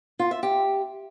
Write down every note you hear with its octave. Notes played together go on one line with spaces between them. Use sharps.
F4
E5
G4